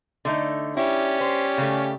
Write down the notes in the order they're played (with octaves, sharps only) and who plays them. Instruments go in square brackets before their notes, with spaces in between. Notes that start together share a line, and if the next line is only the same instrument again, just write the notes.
[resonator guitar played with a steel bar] D3 A3 D#4
[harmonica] C#4 G4 D5 [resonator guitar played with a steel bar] E4
[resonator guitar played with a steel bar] C5
C#3 A3